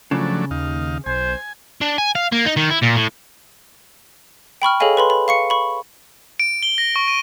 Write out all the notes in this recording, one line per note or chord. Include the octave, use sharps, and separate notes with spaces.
C#3 F3 F#3 A3 D4
D#2 D#4 F5
B1 C5 G#5
D4
G#5
F5
A#3
D#4
D#3
E4
A#2
A2
G5 B5 C#6 F6
G#4 A4 C#5 D#5 F5 G#5
B4 B5 C6
B5
F5 C#6 C#7
B5 C#6
D7
G7
A#6
C#6
D#7